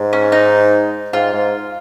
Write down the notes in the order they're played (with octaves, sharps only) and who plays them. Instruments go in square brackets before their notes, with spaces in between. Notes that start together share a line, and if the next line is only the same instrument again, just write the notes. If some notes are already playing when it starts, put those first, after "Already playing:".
Already playing: [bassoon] G#2
[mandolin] C#4
D#4
[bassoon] G#2 [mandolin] F4
[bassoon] G#2